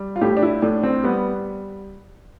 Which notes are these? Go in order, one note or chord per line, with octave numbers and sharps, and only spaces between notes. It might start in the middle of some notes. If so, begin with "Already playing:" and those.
Already playing: G3
F4
A2 G4
D4
E4
A2 D4
C4
G3 B3